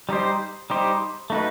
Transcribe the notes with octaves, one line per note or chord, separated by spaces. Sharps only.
G3 D#4 G4 C5
G3 D#4 G4 C5
A3 D#4 F#4 B4